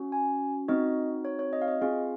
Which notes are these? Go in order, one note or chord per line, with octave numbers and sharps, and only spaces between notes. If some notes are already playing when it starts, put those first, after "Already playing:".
Already playing: C#4 F#4
G#5
C4 D#4 F#4 D#5
C#5
C#5
D#5
F5
D#5
C4 F4 G#4 F5